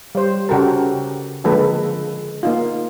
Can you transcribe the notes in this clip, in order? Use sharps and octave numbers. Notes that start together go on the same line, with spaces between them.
G3 C5
C#3 F#4 G4 A4 A#4
D3 F3 G#3 A#3 A4 B4
A#3 D#4 F4